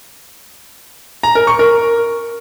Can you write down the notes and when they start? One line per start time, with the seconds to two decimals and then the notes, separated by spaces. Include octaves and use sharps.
1.23 A#5
1.35 A#4
1.47 C#6
1.59 A#4